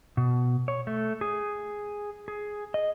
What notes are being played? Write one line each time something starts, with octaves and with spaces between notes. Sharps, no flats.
B2
C#5
A3
G#4
G#4
D#5